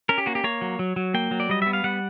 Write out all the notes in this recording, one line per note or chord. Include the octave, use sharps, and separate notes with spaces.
C#4 A#4
G4
A#3 F#4
G4
A#3 C#5
F#3
F#3
F#3
A#3 G5
F#3
D5
G3 D#5
B3 E5
F5
G3 F#5